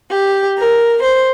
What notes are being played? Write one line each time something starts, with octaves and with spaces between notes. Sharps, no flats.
G4
A#4
C5